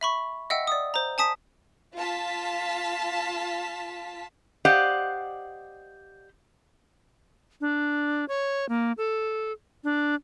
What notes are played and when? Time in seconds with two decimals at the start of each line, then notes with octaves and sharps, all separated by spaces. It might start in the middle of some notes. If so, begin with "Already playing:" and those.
0.01 E5 B5 C#6
0.50 D#5 E5 F#5 G5 E6
0.67 D5 D#6
0.94 C5 A#5
1.18 G#5 A5 D#6 B6
1.95 F4 A5 B6
4.65 G4 C5 D5 D#5 F5 F#5
7.61 D4
8.28 C#5
8.69 A#3
8.98 A4
9.84 D4